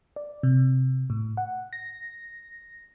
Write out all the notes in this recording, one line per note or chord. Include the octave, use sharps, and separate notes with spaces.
D5
C3
A2
F#5
A#6